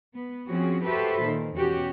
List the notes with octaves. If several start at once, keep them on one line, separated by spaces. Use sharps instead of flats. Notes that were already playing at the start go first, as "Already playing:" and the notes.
B3
F3 C4 C#4 F#4 G#4
F#4 G4 A4 B4 C5 E5
A#2 D#3
E2 B2 C#4 F#4 G4